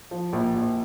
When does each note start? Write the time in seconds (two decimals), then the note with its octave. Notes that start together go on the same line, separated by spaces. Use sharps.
0.11 F3
0.33 A#1
0.55 A#1